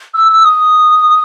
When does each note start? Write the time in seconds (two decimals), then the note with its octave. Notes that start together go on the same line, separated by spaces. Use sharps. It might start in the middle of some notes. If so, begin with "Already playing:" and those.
0.14 E6
0.30 E6
0.44 D#6